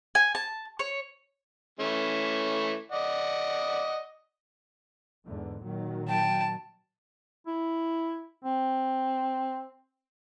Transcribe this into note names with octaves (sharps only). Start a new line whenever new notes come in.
G#5
A5
C#5
E3 A3 C#4
D5 D#5 F#5
E2 G#2 D3
A#2 D#3 F#3
G5 A5
E4
C4